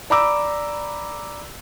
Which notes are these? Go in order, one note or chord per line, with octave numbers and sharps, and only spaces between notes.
D5 A#5 B5 D6 E6